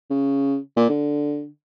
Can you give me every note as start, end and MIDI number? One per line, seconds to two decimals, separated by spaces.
0.10 0.57 49
0.76 0.88 46
0.89 1.47 50